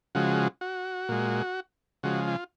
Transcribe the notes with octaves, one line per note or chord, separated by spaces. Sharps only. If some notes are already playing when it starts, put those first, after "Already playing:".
C#3 F3 G#3 F#4
F#4
A#2 G#3
C#3 F3 G#3 F#4
F4